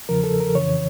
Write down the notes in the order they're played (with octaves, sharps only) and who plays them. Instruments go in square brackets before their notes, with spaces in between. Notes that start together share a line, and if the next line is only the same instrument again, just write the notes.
[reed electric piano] E2 C#3 F3 A#4
A4
A#4
F2 C#3 E3 C#5